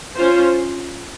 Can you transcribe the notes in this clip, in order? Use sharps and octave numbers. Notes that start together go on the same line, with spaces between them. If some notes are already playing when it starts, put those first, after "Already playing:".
C#4 F4 C5